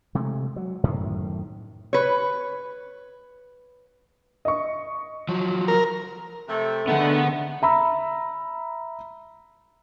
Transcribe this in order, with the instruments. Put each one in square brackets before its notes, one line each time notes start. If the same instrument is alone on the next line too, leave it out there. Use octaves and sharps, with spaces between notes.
[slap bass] C3 G#3 A3
F#3
F#2 A2 C3 D#3
[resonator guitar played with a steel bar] B4 C#5
[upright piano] D#5 C#6
[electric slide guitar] F3 F#3
[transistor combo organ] A#4
[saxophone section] C3 A3
[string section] D3 [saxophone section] D#3 G#3 A3 [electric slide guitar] B3 F#5
[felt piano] E5 A#5 B5 E6